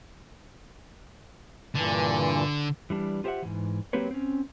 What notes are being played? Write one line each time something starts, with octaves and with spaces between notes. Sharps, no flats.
G2 A#2 D3 E3
E3 G3 D4
F4 G4 C5 D5 E5 F#5
G#2 E3
F#3 A#3 C4 G4 B4 C#5
C4 C#4